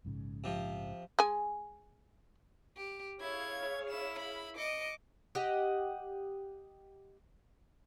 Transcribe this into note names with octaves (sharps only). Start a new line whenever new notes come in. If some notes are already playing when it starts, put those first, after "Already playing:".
A#1 G#2 C#3
C3 F3
G#3 G#5
G4
E4 G#4 C#5 F5 G#6
E4 E7
B5
D#5 D6 C#7
G4 D#5 F#5